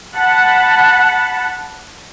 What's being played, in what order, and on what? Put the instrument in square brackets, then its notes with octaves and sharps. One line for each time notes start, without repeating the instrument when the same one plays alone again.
[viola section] F#5 A5 B5